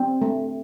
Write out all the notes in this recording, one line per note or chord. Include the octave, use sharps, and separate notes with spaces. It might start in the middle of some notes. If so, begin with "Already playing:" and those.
Already playing: C4
A3